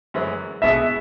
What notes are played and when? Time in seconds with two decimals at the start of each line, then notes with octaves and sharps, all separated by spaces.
0.14 F#2 E3 G#3 E4 B4
0.62 B2 G#3 B3 E4 G#4 E5